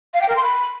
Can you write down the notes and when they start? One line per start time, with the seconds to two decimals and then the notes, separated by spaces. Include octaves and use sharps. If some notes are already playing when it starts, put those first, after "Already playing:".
0.13 F5
0.21 G5
0.28 A#4
0.35 C6
0.43 B5